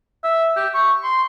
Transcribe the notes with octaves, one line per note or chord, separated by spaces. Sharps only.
E5
G4
C#6
C6